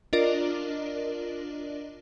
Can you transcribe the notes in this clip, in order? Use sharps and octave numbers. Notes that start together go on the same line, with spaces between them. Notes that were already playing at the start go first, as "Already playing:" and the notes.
D4 F4 A#4 D5 D#5